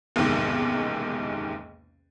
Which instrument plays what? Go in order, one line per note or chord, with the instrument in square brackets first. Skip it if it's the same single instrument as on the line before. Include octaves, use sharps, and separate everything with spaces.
[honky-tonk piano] F#1 B1 E2 G#2 C3 D#3